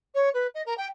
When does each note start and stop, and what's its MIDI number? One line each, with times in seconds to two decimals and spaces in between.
0.14 0.29 73
0.34 0.47 71
0.54 0.62 75
0.66 0.74 70
0.77 0.87 79